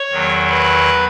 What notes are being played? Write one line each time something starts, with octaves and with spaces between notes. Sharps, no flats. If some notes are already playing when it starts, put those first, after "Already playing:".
Already playing: C#5 C#6
E2 D#3 F#3
B4 B5